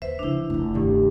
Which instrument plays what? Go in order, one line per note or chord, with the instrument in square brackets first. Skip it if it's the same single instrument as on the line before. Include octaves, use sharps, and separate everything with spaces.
[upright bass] D#2 [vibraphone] B4 C5 E5
[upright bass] C#3 F3 [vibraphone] D4 E4
[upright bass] F1 C3
[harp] G2 D#3